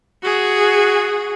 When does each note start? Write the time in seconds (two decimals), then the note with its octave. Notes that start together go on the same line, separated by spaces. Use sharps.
0.23 F#4 G#4